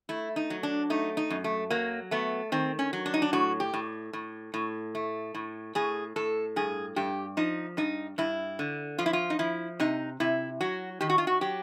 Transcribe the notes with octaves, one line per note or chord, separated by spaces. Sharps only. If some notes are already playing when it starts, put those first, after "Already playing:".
A3 E4
D#4
F#3
D4
A3 D#4
D#4
F#2
A3
F#3 A#3
A3 B3
D#3 C4
C#4
F#3
D4
D#4
D4
A2 F#4
G4
A2
A2
A2
A3
A2
A2 G#4
A2 A4
G2 G#4
G2 G4
F3 D#4
G2 D#4
G2 E4
D3
F3 F4
E4
F4
D#4
F3 E4
C3 D#4
C3 E4
F#3 F#4
D#3 G4
F#4
F4
F#4
F#3 G4